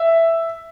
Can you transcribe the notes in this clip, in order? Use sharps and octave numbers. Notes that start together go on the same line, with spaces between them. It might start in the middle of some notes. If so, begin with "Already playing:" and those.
Already playing: E5